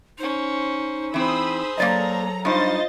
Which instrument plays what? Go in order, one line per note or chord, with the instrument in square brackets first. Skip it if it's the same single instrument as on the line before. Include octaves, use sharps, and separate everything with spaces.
[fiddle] C#4 C5 [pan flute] D#4
[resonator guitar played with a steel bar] E3 C4 [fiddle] G#4 C5 [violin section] B5 D#6 E6
[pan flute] F#3 [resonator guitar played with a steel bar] A#3 D5 D#5 [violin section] A4 A#5
[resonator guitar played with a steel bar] G2 D#4 [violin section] F4 D#5 A6 [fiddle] C5